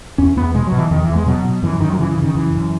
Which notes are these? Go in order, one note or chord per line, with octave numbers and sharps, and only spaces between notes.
E2 C#4
E2 B3
B2 G#3
F#3
B2
E3
E2 D#3
E3
E2
G#3
B2 F#3
B2
F#2 E3
F#2 D#3
F#3
C#3 E3
E3
C#3
D#3
F#2 E3
F#2